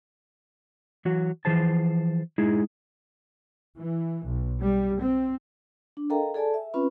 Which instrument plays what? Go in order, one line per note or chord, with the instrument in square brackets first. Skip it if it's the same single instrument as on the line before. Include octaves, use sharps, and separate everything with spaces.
[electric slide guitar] E3 F#3 F#4
E3 F3 G#4 C5 A5
G#3 D#4 E4 G#4
[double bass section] E3
B1
G3
C4
[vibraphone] D4
A4 A#4 D#5 F5 G5 A#5
G#4 A4 D5 G#5 A5
E5
C4 C#4 F4 B4 B5